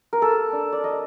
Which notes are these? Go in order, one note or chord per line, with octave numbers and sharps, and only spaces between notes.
A#4
A#3 A4
D4
D5
A#3 D#5